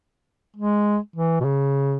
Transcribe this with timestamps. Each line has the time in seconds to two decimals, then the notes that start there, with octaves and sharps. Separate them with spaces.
0.56 G#3
1.16 E3
1.40 B2
1.44 C#3